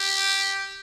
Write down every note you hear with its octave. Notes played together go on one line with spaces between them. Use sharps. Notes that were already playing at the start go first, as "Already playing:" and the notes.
Already playing: G4